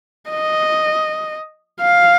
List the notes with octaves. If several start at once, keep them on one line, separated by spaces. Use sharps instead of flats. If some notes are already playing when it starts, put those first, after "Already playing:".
D#5
F5